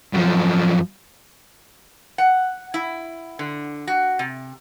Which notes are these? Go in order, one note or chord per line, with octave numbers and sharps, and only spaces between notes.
F#2 F3
F#5
E4
D3
F#4
C3